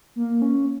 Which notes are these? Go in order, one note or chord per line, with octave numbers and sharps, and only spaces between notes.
A#3
C#4